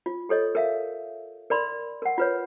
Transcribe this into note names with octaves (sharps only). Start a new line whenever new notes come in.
F4
G4 A4 C#5 D#5
A#4 E5 F5
A#4 D5 B5 C6
A#4 F#5
F4 B4 C#5